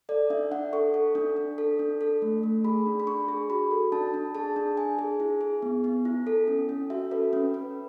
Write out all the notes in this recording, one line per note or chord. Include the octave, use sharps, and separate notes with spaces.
A4 D5
D4 E5
D4 F#5
A4 C#6
A4
D4
D4
A4
D4
A4
A3
A3
G#4 B5
D4
B5
D4 C#6
G#4
F#4 B5
A4
D4 A5
D4
G#4 A5
D4
D4 G#5
G#4
E4
G#4
B3
B3
E4
A4
C#4
C#4
F#4 E5
A4 B4
C#4 B4
C#4 B4